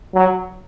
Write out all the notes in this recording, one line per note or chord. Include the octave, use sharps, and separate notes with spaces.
F#3